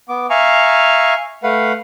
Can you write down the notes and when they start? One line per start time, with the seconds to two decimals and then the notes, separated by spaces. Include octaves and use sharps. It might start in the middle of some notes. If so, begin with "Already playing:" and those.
0.09 B3 D6
0.30 E5 F5 G#5 A#5 C#6
1.43 A3 B4 F5 F#5